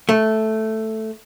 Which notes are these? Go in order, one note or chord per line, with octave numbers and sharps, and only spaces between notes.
A3